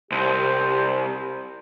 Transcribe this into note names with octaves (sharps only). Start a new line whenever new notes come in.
C2 G4 C5